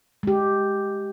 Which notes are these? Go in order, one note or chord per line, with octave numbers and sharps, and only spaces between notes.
G#3 G4